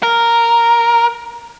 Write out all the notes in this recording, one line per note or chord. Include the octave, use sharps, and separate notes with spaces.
A#4